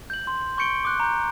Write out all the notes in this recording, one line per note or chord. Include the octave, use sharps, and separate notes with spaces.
G6 F#7
C6
C6 C#6 G6 C#7 D7 G7
D6 F#6 G7
A#5 G6